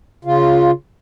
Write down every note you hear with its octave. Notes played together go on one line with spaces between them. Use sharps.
C#3 F4